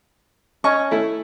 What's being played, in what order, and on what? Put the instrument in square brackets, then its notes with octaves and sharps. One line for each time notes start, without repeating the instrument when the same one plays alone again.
[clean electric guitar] C#4 [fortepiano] D#5 C#6
[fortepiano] A3 E4